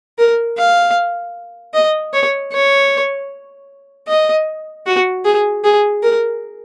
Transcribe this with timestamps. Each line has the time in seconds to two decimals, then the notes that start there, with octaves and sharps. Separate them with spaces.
0.18 A#4
0.57 F5
1.74 D#5
2.14 C#5
2.52 C#5
4.08 D#5
4.86 F#4
5.25 G#4
5.64 G#4
6.03 A#4